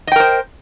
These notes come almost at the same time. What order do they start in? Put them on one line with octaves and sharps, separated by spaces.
D#5 G5 A#4 C5